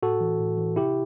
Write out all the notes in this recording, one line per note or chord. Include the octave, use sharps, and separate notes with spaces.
A2 F#4 A4
E3
A2
E3
C3 E4 G4